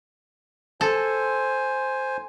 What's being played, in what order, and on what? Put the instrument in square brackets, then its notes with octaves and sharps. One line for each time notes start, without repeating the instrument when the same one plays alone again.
[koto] A4 [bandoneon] C5 G#5